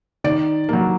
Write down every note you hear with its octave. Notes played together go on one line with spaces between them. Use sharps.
D#3 D5
F#3 A#3